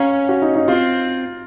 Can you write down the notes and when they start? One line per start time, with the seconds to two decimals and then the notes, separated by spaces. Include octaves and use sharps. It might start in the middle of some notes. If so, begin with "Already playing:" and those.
Already playing: C#4 F5 A#5
0.29 F#4
0.42 D#4
0.56 D#4
0.68 C4 F4